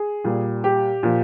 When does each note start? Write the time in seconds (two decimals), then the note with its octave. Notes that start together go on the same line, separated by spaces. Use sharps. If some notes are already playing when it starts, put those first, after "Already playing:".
Already playing: G#4
0.24 A#2 G3
0.64 G4
1.03 A#2 F3